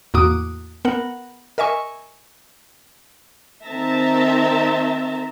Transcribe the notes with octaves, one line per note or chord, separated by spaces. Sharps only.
E2 A2 A#3 F#4 D6 D#6
B3 A#4 F#5
A#4 D#5 E5 G#5 C#6
D#3 C4 E5 A5 A#5